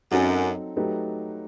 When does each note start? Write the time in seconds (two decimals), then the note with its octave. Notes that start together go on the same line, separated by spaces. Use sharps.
0.12 F#2 F#3 C4 D#4 A4
0.76 F#3 A3 D#4 G4 B4